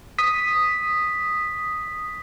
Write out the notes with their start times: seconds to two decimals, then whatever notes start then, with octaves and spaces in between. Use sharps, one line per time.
0.18 D#6 B6